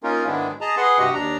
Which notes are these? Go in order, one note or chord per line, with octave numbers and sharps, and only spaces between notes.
A#3 C#4 D#4 F4 A#4
G#2 D#3 G#3 B3 D4 E4
G#4 D#5 A5 A#5
G#4 B4 F#5 C6
G2 C3 F#4 G4 D#5 F#5
D#2 D4 A#5